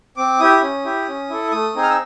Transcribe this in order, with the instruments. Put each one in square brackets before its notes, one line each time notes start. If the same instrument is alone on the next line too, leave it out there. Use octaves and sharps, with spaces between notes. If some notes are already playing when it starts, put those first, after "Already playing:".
[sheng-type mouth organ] C4 D6
E4 G4 D#6
C#4
E4 G4
C#4
E4 A4
A3 D#6
C4 D#4 G#4
F6
E6